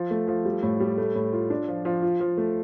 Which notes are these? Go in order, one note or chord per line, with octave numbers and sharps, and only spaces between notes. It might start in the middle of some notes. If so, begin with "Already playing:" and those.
Already playing: F3
A3
F3
G3
A2
G3
A3
A2
F4
D4
F3
F3
F4
F3
A3